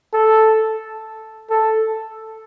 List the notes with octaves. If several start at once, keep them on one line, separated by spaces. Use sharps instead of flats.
A4
A4